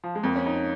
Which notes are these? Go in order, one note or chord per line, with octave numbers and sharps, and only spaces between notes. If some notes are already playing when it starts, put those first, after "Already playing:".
F3
G#3
F2 A#3
C#4
D#4